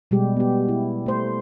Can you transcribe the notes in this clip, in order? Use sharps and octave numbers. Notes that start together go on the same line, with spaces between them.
B2 G3 G#3 G4
B3 G4
E4
A3 C5